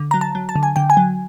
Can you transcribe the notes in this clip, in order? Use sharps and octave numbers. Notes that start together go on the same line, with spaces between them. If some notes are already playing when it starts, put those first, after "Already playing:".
Already playing: D3
F#3 A#5
A5
F#3
A5
D3
G#5
D3 G5
G#5
F#3